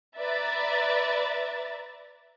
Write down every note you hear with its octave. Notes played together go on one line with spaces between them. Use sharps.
B4 D5 E5 A#5 A6